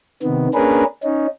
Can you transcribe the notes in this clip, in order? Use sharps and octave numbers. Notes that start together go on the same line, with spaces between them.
C3 D#3 B3
A#3 C#4 D4 G#4 A#4 B4
C#4 D#4